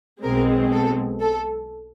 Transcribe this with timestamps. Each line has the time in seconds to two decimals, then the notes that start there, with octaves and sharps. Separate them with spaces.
0.24 B1 B2 G#3 C4 A#4
0.73 A4
1.21 A4